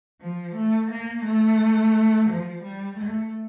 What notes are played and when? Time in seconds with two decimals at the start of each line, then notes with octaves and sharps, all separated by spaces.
0.22 F3
0.55 A3
0.90 A#3
1.24 A3
2.28 F3
2.63 G3
2.97 A3